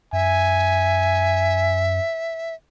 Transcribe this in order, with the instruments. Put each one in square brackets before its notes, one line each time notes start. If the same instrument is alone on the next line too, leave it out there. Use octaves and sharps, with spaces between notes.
[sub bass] F#2 [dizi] E5 [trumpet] G#5